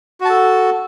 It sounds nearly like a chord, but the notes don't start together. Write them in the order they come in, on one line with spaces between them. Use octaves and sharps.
F#4 A5 A4